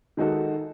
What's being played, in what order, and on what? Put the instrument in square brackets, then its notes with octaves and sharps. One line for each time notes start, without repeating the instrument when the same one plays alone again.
[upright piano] D#3 G#3 D#4 F#4 A4